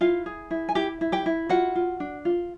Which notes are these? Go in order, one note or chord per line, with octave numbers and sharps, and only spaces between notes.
E4 F4 F5
G#4
E4
G#5
E4 G4 G5
E4
G4 G5
E4
F4 F#4 F#5
F4
D4
F4